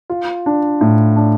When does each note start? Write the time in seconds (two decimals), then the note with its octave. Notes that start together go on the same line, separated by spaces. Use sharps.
0.10 F4
0.46 D4
0.81 A2
1.16 D4